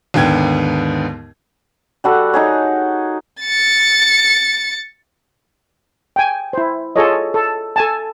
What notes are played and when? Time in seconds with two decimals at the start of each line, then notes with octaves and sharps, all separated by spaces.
0.14 D#2 G#2 D3 B3 G5 G#6
2.04 G3 F#4 A4 F#5
2.34 D#4 G#4 C#5
3.41 A6 C#7
6.16 G5 G#5
6.53 E4 C5
6.96 F4 G#4 A4 C#5 D#5
7.34 A4
7.76 A4 G#5 A5